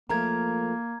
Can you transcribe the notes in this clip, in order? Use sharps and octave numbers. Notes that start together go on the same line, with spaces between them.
F3 A3 A#3 A#4 A#5 G#6